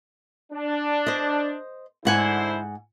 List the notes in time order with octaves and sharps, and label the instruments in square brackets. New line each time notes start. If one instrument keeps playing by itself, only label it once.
[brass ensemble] D4
[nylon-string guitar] C5 D#5
[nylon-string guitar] G#2 F#5 G#5 [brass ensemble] D3 E4 C5